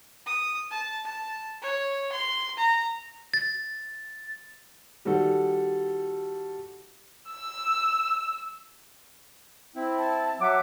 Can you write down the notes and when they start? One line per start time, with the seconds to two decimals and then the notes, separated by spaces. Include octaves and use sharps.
0.26 D#6
0.70 A5
1.05 A5
1.62 C#5
2.12 C6
2.58 A#5
3.34 A6
5.05 D#3 G3 F#4 A4
7.31 E6
9.76 C4 E4
9.98 A5
10.40 F#3 E5 F#5 D6